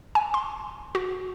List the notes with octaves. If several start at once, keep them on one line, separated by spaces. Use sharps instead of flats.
G#5
C6
F#4